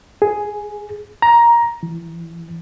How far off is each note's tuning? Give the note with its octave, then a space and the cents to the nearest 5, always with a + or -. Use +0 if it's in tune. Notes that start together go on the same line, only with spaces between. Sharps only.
G#4 +5
A#5 +10
E3 +15